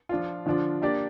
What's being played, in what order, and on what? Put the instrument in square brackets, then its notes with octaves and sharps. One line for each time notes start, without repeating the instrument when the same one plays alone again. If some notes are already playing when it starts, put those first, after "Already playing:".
[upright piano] F3 D4 F4
D3 F3 D4 F4
A#3 D4 G4 D5